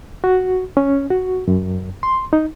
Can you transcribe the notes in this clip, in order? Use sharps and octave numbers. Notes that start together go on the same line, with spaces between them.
F#4
C#4
F#4
F#2
C6
D#4